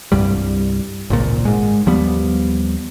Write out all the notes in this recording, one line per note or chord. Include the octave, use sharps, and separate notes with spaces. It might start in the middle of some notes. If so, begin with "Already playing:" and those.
C2 G2 G3
G#1 C#2 A#2
G#2 G#3
D#2 F3 G3 B3